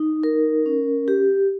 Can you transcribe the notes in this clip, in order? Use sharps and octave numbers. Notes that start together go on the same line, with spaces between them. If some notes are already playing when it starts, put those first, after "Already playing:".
Already playing: D#4
A#4
C#4
G4